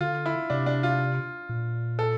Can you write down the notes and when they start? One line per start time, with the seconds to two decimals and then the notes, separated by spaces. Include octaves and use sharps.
0.01 D3 F4
0.26 E4
0.50 C3 D4
0.66 D4
0.83 F4
1.49 A#2
1.99 A4